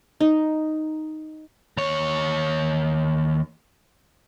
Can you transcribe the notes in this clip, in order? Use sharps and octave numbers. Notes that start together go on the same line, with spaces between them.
D#4
D#2 C#5